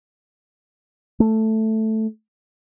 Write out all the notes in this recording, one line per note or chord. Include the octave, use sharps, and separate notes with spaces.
A3